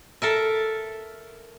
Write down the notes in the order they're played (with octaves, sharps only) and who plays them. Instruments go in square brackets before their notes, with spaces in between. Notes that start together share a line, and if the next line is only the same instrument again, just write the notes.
[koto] A4 A#4 E5